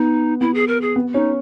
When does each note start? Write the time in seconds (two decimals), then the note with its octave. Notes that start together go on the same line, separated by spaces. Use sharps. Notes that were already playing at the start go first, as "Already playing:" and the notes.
Already playing: B3 D#4
0.41 B3 E4
0.54 G#4
0.68 A#4
0.82 G#4
0.96 B3
1.14 C#4 D#4